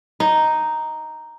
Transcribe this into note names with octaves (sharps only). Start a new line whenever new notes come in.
D#4